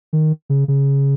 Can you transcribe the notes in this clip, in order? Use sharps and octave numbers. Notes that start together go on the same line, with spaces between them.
D#3
C#3
C#3